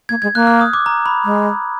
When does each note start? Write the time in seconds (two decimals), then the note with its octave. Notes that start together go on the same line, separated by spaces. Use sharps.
0.09 A#3 G#6
0.22 G#3 G#6
0.35 A#3 F#6
0.47 F6
0.61 D#6
0.73 D6
0.86 A#5
1.06 B5
1.25 G#3